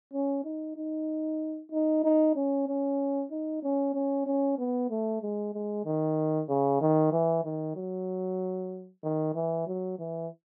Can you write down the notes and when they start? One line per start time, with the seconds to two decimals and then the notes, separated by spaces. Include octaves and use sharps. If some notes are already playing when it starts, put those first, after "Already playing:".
0.13 C#4
0.45 D#4
0.77 D#4
1.72 D#4
2.04 D#4
2.36 C#4
2.68 C#4
3.31 D#4
3.63 C#4
3.94 C#4
4.27 C#4
4.58 B3
4.90 A3
5.22 G#3
5.54 G#3
5.85 D#3
6.49 C#3
6.81 D#3
7.13 E3
7.44 D#3
7.76 F#3
9.04 D#3
9.35 E3
9.67 F#3
9.99 E3